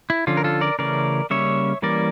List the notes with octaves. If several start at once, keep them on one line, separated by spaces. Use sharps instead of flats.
E4
D3 F3 C#4 F4
A#4
F4 A4
A#4 D5
C#3 E3 A3 C#4 A#4 D5
C#3 G3 A#3 C#4 C#5 E5
E3 G3 A#3 C#4 A#4 D5